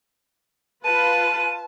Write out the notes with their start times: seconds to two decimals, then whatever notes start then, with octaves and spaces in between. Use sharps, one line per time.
0.84 F4 B4 A5 D#7